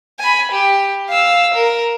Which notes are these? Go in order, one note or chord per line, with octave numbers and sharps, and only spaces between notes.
G#5 B5
G4
F5 E6
A#4